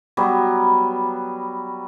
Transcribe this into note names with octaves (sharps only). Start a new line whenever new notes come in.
F#3 G3 B3